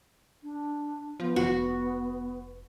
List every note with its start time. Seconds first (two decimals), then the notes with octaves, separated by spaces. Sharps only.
0.44 D4
1.20 F3 B3
1.36 F1 F#4